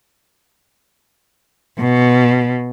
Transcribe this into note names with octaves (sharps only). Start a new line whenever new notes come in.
B2